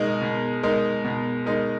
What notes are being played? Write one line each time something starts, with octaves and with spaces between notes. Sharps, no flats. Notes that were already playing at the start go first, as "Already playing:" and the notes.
Already playing: B2 G#3 D#4 A#4
B2
G#3 D#4 A#4
B2
G#3 D#4 A#4